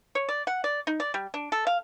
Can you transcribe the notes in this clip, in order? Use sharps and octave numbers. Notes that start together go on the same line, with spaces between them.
C#5
D5
F#5
D5
D#4
D5
G3
D4
A4
F5